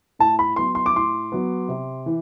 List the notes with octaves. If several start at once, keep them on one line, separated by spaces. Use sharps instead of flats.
A2 A5
B5
F#3 B3 C6
C6
D6
A2 C6
F#3 B3
C3
E3